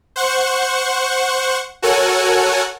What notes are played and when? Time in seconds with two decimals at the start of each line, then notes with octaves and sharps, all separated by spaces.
0.16 C5 F#5 C#6
1.82 F#4 A4 A#4 C#5 F#5 G#5